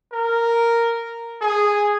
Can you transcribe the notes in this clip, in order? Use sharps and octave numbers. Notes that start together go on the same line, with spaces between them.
A#4
G#4